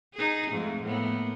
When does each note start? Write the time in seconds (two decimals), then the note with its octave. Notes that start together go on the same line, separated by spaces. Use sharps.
0.14 D#4 G#4
0.51 F2 G#2 A3
0.83 A2 A#3 B3